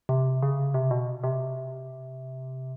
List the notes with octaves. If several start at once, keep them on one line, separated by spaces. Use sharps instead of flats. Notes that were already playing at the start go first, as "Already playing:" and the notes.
C3
C#3
C3
B2
C3